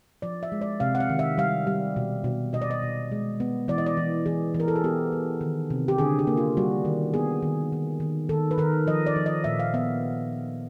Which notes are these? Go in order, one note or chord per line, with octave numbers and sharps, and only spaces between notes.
F3 D5
E5
G#3
D5
C3 F5
F#5
F5
D#3
E5
G3 F5
G3
B2
B2
B2 D#5
D5
D#5
B2
G#3
B3
E3 D5
D#5
D5
E3
E3 G#4
E3
A#4
A4
G#4
B3 G4
B3
D#3
C3
G4
D3 G#4
G4
A#3
F4
G3 F#4
D#3
B3 G#4
D#3
D#3
D#3
D#3 A4
B4
D#3 A#4
F3 D#5
D5
F3
D#5
A#2 E5
F5
B3 E5